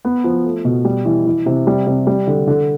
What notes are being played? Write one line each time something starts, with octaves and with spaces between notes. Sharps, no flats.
B3
F3
A3
B2
G3
E3
E3
C3
G3
C3
G3
D3
D3